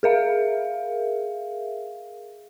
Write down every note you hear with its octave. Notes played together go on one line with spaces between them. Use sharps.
G#4 A#4 E5 F5